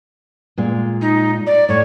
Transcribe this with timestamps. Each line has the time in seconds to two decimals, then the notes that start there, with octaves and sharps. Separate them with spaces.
0.58 A#2 G#3 F5
1.01 D#4
1.47 D5
1.69 A2 C#5